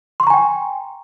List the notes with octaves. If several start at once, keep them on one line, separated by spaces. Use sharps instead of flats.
G5 G#5 A#5 C6 C#6